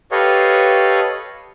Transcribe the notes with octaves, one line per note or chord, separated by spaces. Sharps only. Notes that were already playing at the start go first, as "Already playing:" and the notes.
G4 A4 B4 C#5 D#5 F5